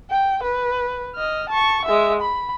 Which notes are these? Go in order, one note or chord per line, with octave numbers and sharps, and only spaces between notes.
G5
B4
D#5 F6
A5 C#6
G#3 E5
B5